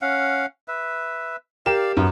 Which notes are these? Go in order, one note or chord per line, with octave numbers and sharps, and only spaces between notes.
C#4 F5 F#5
B4 E5
G4 A#4 D5 F5 E7
F#2 B3